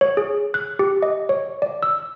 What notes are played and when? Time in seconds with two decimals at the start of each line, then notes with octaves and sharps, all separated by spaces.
0.01 C#5
0.17 G#4
0.54 F#6
0.79 G4
1.02 D#5
1.29 C#5
1.62 D5
1.83 E6